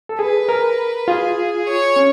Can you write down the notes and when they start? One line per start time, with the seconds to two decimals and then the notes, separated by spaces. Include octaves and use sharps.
0.09 A4
0.19 G#4 B4
0.49 A#4
1.08 F4 G#4
1.67 C#5
1.96 C#4